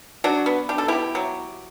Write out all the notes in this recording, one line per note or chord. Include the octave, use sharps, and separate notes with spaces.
F#3 D4 F#4
B3
D4 G4
A4
B2 E4 G4
F#3